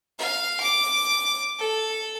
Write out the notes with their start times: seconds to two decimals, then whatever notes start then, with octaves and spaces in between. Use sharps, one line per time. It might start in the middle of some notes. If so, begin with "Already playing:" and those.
0.19 F5
0.61 D6
1.59 A4